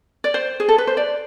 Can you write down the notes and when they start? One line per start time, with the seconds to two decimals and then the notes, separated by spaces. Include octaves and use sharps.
0.24 D5
0.34 C5
0.60 G#4
0.69 A4
0.78 B4
0.87 C5
0.97 D5